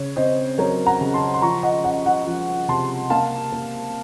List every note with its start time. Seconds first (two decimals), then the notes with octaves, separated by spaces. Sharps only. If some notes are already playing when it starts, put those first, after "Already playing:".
Already playing: C#3 C#5
0.16 C4 C5 D#5
0.58 F#3 A#4 C#5
0.86 F#5 A#5
1.01 C#3
1.14 A5 C6
1.34 C6
1.42 F3 A#5 C#6
1.63 D#5 F#5
1.84 C#4 D#5 F#5
2.06 D#5 F#5
2.27 F3
2.68 C3 A5 C6
3.10 A#3 F5 A5
3.52 A#3